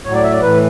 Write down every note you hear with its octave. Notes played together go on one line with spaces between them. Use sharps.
A2 F#3 C#5
D5
E5
D5
A2 E3 B4